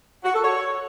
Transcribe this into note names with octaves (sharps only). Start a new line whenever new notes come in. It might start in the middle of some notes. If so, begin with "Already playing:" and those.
F#4
A4
C#5